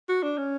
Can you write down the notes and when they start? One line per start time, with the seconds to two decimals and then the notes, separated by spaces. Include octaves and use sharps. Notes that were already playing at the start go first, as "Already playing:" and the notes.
0.09 F#4
0.23 D4
0.38 C#4